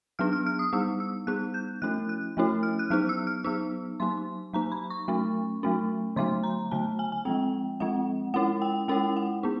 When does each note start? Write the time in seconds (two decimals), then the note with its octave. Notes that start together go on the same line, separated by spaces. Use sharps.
0.19 F#3 B3 D4 F6
0.33 F6
0.47 F6
0.59 D#6
0.73 G3 B3 D#4 E6
1.00 E6
1.27 G3 B3 D#4 F#6
1.54 G6
1.82 F3 A3 C#4 E4 F#6
2.09 F#6
2.37 F3 A3 C#4 E4
2.63 F6
2.79 F#6
2.90 F#3 B3 D#4 F6
3.09 E6
3.27 F6
3.44 F#3 B3 D#4 E6
4.00 F#3 A#3 D#4 C6
4.53 F#3 A#3 D#4 A#5
4.72 B5
4.90 C#6
5.08 F#3 A3 C#4
5.63 F#3 A3 C#4
6.16 D3 F#3 A3 C6
6.44 A#5
6.71 D3 F#3 A3 A5
6.99 G#5
7.12 G#5
7.25 F3 G#3 C4 G5
7.80 F3 G#3 C4 F#5
8.34 G#3 C#4 E4 F#5
8.62 G5
8.88 G#3 C#4 E4 G5
9.16 F#5
9.43 B3 D#4